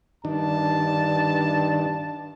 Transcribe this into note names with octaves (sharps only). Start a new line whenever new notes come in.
G2 D#3 D4 A5